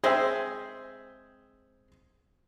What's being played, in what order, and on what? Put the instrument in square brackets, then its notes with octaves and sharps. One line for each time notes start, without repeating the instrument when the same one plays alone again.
[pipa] G#3 C4 C5 [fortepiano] G#4 E5